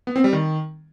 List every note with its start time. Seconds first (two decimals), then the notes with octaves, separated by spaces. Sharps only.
0.07 B3
0.16 C4
0.24 G3
0.33 D#3